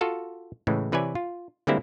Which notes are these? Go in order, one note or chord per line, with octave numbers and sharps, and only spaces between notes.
F4 F#4 A4 F5
A2 C#3 E3 G#3
C3 E3 B4 C#5 D5 G#5
F4
D3 G3 G#3 A#3 C4 E4